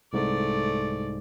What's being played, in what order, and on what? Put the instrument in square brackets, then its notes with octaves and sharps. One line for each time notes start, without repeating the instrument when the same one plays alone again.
[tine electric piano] C2 G#2 [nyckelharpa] A3 D5